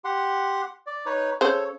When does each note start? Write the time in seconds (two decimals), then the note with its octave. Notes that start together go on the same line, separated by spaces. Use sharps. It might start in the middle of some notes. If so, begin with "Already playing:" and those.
0.05 G4 F#5 C6
0.87 D5
1.06 D#4 B4 C#5
1.41 C#3 A4 C5 C#5